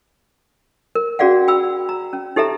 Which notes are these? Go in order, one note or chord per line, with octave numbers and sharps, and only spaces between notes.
A#4
C#4 F#4 G#4 D5 F5 F#5
G5 B5 E6
A#5
C#4
D#4 G4 A4 E5 A#5